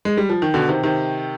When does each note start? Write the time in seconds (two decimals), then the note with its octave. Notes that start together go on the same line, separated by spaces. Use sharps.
0.05 G#3
0.17 G3
0.29 F3
0.42 D#3
0.54 B2 D3
0.69 C3 D#3
0.83 C3 D#3